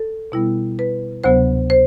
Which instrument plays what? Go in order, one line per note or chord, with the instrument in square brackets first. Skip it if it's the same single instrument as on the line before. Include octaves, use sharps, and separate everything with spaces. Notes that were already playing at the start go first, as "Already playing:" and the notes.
Already playing: [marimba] A4
B2 G3 B3 E4
B4
D2 C3 F#3 B3 C5
C5